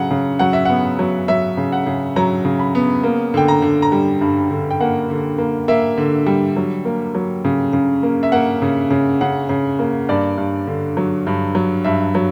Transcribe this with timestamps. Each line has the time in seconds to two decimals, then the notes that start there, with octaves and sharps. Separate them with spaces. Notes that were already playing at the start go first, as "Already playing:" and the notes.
Already playing: C#3 F#3 F#5
0.11 C#3
0.39 F#3 F#5
0.53 E5
0.65 B3 F#5
0.99 F#3
1.28 F#3 E5
1.57 C#3
1.72 F#5
1.86 C#3
2.16 F#3 A#5
2.45 C#3
2.59 B5
2.75 B3
3.03 A#3
3.34 D3 G5
3.48 A#5
3.62 D3
3.82 A#5
3.92 G3 G5
4.21 G2
4.50 D3
4.71 G5
4.80 A#3 F#5
5.10 D3
5.38 A#3
5.68 A#3 E5
5.98 D3
6.26 G3
6.56 F#3
6.85 A#3
7.15 F#3
7.45 C#3
7.73 C#3
8.03 A#3
8.23 E5
8.32 A#3 F#5
8.62 C#3
8.91 C#3
9.21 C#3 F#5
9.49 C#3
9.79 A#3
10.09 G2 D5
10.38 G2
10.67 D3
10.97 F#3
11.27 G2
11.55 F#3
11.84 G2 E5
12.15 F#3